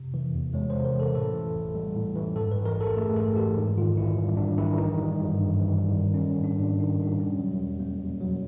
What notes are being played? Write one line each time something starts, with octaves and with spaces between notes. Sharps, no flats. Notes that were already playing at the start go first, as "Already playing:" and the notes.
Already playing: C3
E3
E2
G#3 C#5
C5
C3
A#4
E3 A4
A2 A4
E3
A1
G3
A2
E3
G#2 A4
B4
E3
A#4
A1 A4
A3 G#4
G#2 A4
E3 G4
G#2
D#3 F4
A#1 E4
G3
G#2 D4
D#3 E4
E3 D#4
G3
G2
G2
E3
G3
D#3
C#4
G3
C#4
G#2 D4
G#2 D4
D#3 D#4
G3 D4
B2 C#4
F#3
E2
A#3
B2
F#3